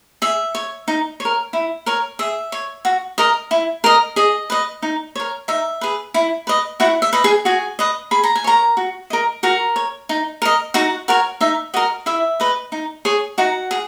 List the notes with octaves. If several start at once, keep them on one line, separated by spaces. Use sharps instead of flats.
G#4 E5
C#5
D#4
C#5
A#4
E4
A#4 C#5
G#4 E5
C#5
F#4
A#4 D#5
E4
A#4 D#5
G#4 D#5
B4 D#5
D#4
A#4 C#5
D#4 E5
G#4 B4
E4
B4 D#5
E4 F#4 F#5
E5
B4 D#5
G#4 G#5
F#4 G#4 G#5
B4 D#5
G#4 B5
A#5
G#5
A#4 C#5 A#5
F#4
A#4 D#5
F#4 A#4 A#5
C#5
D#4
A#4 D#5
D#4 F#4 F#5
F#4 A#4 C#5
D#4 E5
F#4 A#4 D#5
E4 E5
B4 D#5
D#4
G#4 C#5
D#4 F#4 F#5
G#4